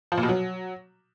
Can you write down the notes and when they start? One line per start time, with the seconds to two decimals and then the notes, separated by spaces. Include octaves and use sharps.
0.12 F3
0.17 A#2
0.23 B2
0.29 F#3